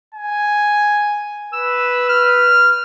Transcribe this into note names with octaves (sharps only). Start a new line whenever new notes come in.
G#5
B4 E6
F6